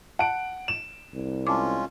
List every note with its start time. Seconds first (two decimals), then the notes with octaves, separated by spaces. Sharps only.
0.19 F#5 A5 D7
0.68 E7
1.14 C2
1.47 G#3 C#4 F4 A5 D6